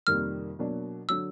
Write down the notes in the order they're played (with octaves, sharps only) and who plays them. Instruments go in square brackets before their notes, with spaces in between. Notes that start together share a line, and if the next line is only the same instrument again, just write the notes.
[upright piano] F2 C3 D#3 G3 A#3 [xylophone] F6
[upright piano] B2 F#3 A#3 D4
[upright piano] D3 F#3 [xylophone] E6